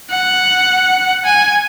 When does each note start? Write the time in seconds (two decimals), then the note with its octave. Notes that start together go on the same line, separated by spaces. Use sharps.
0.11 F#5
1.25 G#5